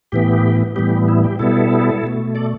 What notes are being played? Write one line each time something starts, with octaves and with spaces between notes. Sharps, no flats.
A2 E3 B3 G4
A2 E3 G3 B3 G4
E4
G4
B2 G3 B3 E4 A4
B2 A3
A4 D5